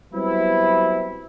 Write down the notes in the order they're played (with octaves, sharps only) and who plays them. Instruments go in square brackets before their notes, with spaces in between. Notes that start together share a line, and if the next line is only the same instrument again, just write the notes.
[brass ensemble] F#3 G3 B3 C4 E4